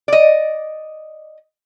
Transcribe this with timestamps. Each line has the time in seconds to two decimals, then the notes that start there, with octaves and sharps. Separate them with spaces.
0.08 D5 D#5